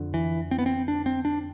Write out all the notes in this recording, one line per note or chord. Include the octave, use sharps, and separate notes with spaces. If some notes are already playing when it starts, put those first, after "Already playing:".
Already playing: F2 D3
E3
C4
B3
C4
D4
C4
D4